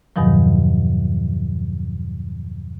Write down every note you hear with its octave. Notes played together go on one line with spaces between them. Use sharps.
E2 G2 B2 D#3 F3 F#3